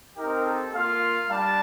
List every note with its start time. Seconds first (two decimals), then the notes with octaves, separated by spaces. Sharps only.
0.17 C4 D#4 G4 A#4
0.45 A4
0.73 A#3 F4 F5
1.30 G3 D4 A5